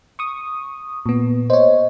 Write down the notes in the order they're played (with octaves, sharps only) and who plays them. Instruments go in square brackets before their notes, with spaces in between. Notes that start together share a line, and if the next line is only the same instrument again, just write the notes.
[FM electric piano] C#6 D#6
A#2 B3
[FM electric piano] C5 C#5 [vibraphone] D#5